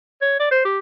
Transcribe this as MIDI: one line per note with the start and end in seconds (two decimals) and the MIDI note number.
0.22 0.40 73
0.40 0.48 74
0.51 0.64 72
0.65 0.79 67